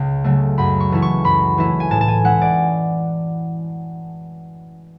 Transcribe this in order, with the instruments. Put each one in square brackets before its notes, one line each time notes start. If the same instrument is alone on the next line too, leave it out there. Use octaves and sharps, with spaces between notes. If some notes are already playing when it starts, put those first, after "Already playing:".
Already playing: [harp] C#2 C#3
C#3 F#3 A3
F#2 B5
C#6
E3 A3 C#4 E4
C#6
F#2 B5
E3 A3 C#4 E4
G#5
A2 A5
A5
G#5
G#3 C#4 E4 F#5
D5